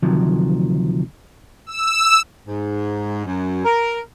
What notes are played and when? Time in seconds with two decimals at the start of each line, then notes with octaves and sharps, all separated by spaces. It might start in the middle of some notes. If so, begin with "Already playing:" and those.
0.02 D2 C3 D#3 F3 F#3
1.66 E6
2.47 G#2
3.25 F#2
3.65 A#4